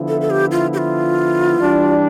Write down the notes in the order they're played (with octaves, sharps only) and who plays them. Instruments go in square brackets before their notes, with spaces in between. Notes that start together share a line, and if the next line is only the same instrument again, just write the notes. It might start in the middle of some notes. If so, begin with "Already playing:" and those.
Already playing: [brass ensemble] D3 F3 B3 E4
[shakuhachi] A4
A4
G4
F4
G4
F4
[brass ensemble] E3 G3 D4